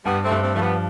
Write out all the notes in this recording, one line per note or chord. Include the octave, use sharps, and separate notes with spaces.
G2 G3 B3
A3 C4
G2
A3 C4
F3 A3
G3 B3